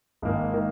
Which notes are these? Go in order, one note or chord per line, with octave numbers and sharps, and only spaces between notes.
G#1 G#2 D#3 A#3
D#3 A#3